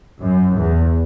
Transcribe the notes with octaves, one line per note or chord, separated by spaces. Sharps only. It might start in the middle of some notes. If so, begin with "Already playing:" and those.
F#2
E2